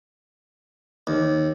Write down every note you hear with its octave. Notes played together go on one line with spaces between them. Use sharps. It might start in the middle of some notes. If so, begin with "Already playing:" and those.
D#2